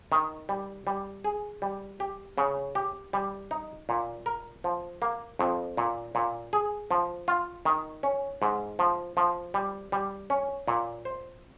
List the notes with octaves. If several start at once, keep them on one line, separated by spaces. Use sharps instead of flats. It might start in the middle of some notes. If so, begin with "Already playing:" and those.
D#3
G3
G3
G#4
G3
G4
C#3
G4
G3
D#4
A#2
A#4
F3
A#3
F2
A#2
A#2
G#4
F3
F4
D#3
C#4
G#2
F3
F3
G3
G3
C#4
A#2
C5